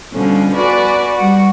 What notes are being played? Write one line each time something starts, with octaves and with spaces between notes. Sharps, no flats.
B2 D3 F3 G3 C#4
F#4 B4 D5 G#5
G3 F#4